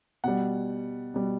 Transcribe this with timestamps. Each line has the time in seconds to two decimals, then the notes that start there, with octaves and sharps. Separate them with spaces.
0.24 B2 G3 F#5
1.14 B2 G3